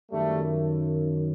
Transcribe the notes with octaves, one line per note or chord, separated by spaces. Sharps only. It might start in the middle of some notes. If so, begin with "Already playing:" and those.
F#2 D#3 G3 A3